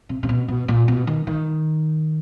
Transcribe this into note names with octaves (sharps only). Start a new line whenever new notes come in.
C3
C3
B2
B2
A#2
B2
D#3
D#3